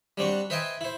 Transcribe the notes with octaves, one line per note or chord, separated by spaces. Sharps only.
G3 C4 D4 F#4
B4 C5 D#5 E5 G5 G#5
E4 C5